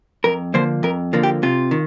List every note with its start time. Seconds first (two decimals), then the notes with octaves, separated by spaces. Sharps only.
0.24 F2 A#4
0.54 D3 F3 A#3 C5
0.83 F2 A#4
1.13 D3 F3 A#3
1.23 G4
1.43 C3 F4
1.71 D#3